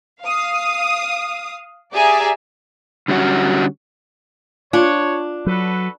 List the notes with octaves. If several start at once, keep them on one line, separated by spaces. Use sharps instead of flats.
F5 D#6
G4 G#4 D5 E5 G#5 A#5
D3 G3 C#4 F#4
D4 F4 C#5
F#3 F#4 A4 B4